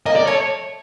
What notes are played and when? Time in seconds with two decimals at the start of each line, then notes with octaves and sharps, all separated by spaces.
0.06 A#3 D#5
0.16 D5
0.26 A3 C#5